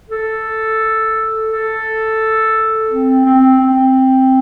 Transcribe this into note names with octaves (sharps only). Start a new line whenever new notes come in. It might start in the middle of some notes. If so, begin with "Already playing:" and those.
A4
A4
C4
C4
C4